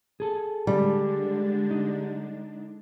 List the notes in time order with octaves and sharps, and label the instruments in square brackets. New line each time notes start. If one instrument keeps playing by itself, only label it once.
[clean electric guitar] G#4 A4
[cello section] D3 G#3 D4 [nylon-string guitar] G3
[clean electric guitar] D#4